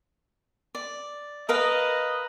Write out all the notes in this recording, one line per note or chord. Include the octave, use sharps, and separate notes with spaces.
D5
A#4 B4 D#5 F5